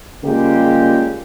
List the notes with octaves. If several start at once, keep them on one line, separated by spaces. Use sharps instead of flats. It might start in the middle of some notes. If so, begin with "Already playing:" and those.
C#3 G3 G#3 A#3 F4 G4